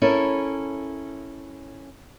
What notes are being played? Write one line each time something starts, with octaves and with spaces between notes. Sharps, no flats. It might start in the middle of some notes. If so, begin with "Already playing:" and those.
C#4 E4 A4 A#4